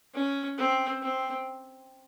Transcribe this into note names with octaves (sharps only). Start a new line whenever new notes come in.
C#4
C4
C4